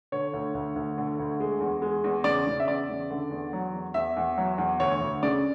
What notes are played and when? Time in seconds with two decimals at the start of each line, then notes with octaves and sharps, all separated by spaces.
0.12 D3 C#5
0.33 D2
0.54 D2
0.76 D2
0.98 D3
1.19 D2
1.40 G#3
1.61 E2
1.82 G#3
2.04 E2
2.24 C#3 D5
2.47 C#3
2.60 E5
2.67 E2 D5
2.89 C#3
3.10 D3
3.31 E2
3.53 F#3
3.73 E2
3.94 E2 E5
4.17 E2
4.38 F#3
4.58 E2
4.80 D2 C#5
5.01 D2
5.23 C#3 D5